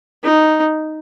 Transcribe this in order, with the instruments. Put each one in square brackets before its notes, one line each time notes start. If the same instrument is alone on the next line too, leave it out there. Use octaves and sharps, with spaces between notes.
[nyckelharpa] D#4